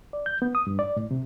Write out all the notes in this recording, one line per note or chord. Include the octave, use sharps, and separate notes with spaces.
D5
G6
B3
D#6
G2
D5
A2
C3